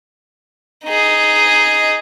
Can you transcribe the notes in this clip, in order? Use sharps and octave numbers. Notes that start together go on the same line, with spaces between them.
D#4 G#4